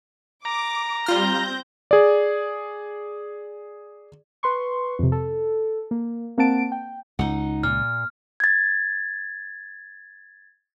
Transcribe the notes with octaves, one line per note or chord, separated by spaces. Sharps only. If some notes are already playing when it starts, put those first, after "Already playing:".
A#5 D6
G3 C4 F4 F6 G6 A#6
G#4 D5
B4 C6 C#6
F2 C3
A4
A#3
A#3 C4 F#5 A5 D7
G5
C#2 D#4 F#5
A#2 F6
G#6 A6